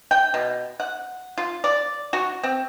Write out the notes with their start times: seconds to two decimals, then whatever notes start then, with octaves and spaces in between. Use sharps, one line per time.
0.11 G5
0.34 B2
0.80 F#5
1.38 F4
1.64 D5
2.13 F#4
2.43 C4